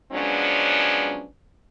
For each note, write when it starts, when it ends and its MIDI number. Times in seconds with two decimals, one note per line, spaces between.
0.13 1.25 53
0.13 1.25 54
0.13 1.25 56
0.13 1.25 59
0.13 1.25 61
0.13 1.25 62